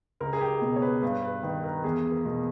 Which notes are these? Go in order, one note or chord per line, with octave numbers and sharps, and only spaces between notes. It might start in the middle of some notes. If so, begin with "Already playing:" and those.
C#2 A#4
G#4
G4
B2 G4
C#5
B4
G2 B4
B4
D#3 B4
A#4
E2 G#4
A#4
B2